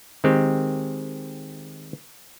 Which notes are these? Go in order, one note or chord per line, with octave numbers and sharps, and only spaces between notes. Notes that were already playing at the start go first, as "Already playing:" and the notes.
D#3 G#3 C4 G4